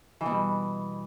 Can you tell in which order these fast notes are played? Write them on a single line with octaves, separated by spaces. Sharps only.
E3 B2 G3